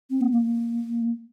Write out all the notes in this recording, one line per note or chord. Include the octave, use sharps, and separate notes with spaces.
C4
A#3
A#3